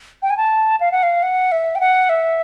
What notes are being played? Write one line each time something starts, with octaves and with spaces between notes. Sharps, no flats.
G5
G#5
A5
F5
F#5
F5
F#5
E5
G5
F#5
E5